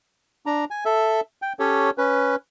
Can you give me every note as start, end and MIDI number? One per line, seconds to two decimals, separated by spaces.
0.46 0.65 62
0.46 0.65 82
0.70 0.84 80
0.85 1.21 69
0.85 1.21 76
1.42 1.53 79
1.59 1.90 61
1.59 1.90 67
1.59 1.90 69
1.59 1.90 73
1.98 2.36 61
1.98 2.36 71